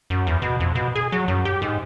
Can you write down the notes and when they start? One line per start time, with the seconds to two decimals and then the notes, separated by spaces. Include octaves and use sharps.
0.10 F#2
0.27 E2
0.42 B2
0.60 F2
0.75 B2
0.96 G#4
1.12 F#3
1.28 F#2
1.45 G4
1.62 G#2